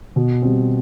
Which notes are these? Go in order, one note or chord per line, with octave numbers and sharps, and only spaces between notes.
B2
G3 C4